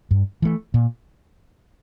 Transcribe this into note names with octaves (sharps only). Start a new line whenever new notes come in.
G2
E3 A3
A#2